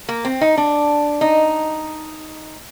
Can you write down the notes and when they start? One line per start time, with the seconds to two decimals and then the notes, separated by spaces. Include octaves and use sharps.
0.09 A#3
0.25 C4
0.41 D#4
0.57 D4
1.21 D#4